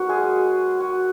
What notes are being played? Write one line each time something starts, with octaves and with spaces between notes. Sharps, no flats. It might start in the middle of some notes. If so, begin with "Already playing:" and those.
Already playing: F#3 A#3 B3 D#4 F#4 A#4
G#3 G#4
F#4